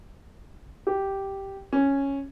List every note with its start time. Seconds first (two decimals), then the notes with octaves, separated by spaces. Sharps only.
0.87 G4
1.73 C#4